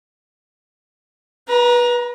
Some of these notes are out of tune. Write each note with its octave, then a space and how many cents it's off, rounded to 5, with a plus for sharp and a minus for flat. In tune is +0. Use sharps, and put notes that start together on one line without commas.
B4 -25 A#5 +20